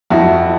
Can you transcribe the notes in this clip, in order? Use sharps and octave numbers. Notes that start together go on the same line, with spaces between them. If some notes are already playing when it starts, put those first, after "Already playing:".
F2 E4 F#4